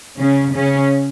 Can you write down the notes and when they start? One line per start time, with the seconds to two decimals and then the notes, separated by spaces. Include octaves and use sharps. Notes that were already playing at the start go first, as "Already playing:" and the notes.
0.18 C#3 C#4
0.55 C#3 C#4